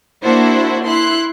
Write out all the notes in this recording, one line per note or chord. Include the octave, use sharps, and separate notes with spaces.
A#3 D4 E4 F#4 C5
E4 C6 F#6